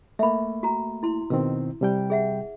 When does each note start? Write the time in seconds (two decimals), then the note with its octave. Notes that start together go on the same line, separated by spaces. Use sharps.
0.19 A3 A#3 E5 B5
0.63 F#4 A#5
1.03 E4 C6
1.30 B2 D#3 C4 E6
1.81 C3 G3 G5
2.10 G#4 E5 F#5